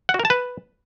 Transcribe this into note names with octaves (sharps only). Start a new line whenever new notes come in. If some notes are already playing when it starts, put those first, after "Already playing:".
F#5
F#4
A#4
A5
B4